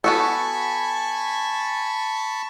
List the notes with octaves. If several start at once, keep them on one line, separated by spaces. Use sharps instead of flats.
B3 F#4 A4 G#5 A5 B5 C#6